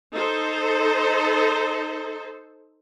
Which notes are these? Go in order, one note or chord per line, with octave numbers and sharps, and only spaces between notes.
D#4 A4 C5